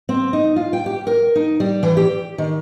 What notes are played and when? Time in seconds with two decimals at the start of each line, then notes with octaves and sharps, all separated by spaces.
0.09 C4
0.33 D#4
0.56 F4
0.73 G5
0.86 G4
1.07 A#4
1.35 D#4
1.60 G3
1.83 E3
1.97 G4
2.38 D#3